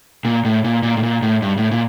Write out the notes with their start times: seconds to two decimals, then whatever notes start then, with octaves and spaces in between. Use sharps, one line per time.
0.25 A#2
0.45 A2
0.64 A#2
0.83 A#2
0.97 A2
1.03 A#2
1.22 A2
1.42 G2
1.57 A2
1.71 A#2